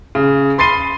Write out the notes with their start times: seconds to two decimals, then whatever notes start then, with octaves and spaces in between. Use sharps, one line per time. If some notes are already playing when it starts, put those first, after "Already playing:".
0.15 C#3
0.58 B5 C6 A6 C7 D#7 G7